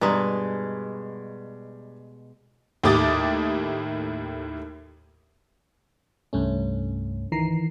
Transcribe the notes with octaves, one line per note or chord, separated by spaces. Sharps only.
G2 B2 G#3 A#5
D#2 A2 G4 D6 D#6 A6
C2 G2 A3 C#4
D#3 E3 A#5 C7